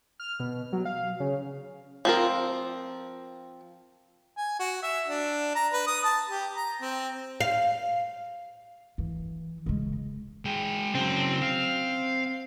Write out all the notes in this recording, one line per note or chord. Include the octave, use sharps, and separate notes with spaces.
F6
B2
F#3
F5
C#3
F3 C4 A#4
G#5
F#4
E5
D4
A#5
B4
D#6
A5
G4
A#5
C4
F5
E3
C#3 G#3
G#3 G5
C#3 F#3 C4
F5